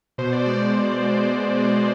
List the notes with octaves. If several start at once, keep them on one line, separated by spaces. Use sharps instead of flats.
B2 C5
D5
G#3 D5
D5
B2
G#3
B2
G#3